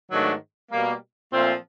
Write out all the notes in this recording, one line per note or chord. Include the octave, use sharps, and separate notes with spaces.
G#2 D#3 F#3 A3 D4
B2 G3 A#3
A#2 F3 A3 C4 F4